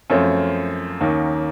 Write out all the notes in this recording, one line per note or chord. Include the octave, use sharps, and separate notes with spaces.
F#2 F3 A3 C4 C#5
D#2 D#3 A#3 C#4